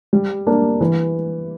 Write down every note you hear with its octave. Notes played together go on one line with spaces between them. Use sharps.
G3
A#3 D4
E3